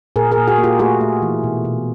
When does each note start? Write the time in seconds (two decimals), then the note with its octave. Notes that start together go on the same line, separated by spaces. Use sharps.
0.16 A#2 G#4 A#4
0.31 G#4 A#4
0.37 A#2
0.48 F#4 G#4
0.58 A#3
0.64 F4 G4
0.79 A3 F#4 G#4
1.01 A3
1.22 E3
1.44 B2
1.65 B2